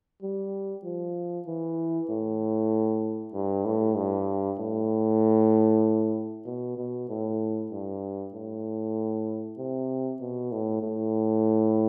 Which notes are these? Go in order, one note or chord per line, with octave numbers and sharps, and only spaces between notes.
G3
F3
E3
A2
G2
A2
G2
A2
B2
B2
A2
G2
A2
C3
B2
A2
A2